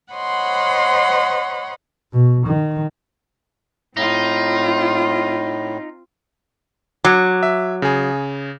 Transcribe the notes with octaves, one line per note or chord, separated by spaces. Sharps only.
C5 C#5 D#5 F#5 B5 C6
B2
D#3
A2 C4 D#4 F4
F#3 D6 G#6
E5
C#3 G#4